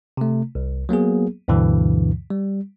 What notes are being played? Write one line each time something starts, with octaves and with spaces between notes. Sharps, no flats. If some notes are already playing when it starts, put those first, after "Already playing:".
C3 A3
C2
F#3 A#3 B3 G#4
D2 G2 B2 D3 E3
G3